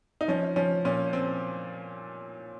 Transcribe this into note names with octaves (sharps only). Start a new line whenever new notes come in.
D#4
F3 C#4
F3 C#4
A#2 C#4
C4